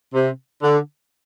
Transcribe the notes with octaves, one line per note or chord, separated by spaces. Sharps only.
C3
D3